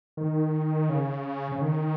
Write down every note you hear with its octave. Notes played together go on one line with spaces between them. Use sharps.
D#3
C#3
C#3
D#3